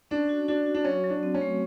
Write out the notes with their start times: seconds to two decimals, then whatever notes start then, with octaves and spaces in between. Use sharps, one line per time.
0.11 C#4 D4
0.29 F#4
0.48 D4 F#4
0.66 F#4
0.75 D4
0.85 F#3 C#4
1.04 F#3
1.10 D4
1.23 C4
1.35 C#4
1.41 A3